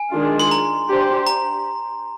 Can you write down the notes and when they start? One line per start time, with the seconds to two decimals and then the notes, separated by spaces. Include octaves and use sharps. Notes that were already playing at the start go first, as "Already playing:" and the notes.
Already playing: G#5
0.13 D#3 G#3 D4 F4 G#4
0.40 C6
0.51 A#5
0.89 D4 G4 C5
1.27 A#5